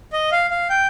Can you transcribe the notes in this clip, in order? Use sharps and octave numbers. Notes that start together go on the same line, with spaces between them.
D#5
F5
F5
G5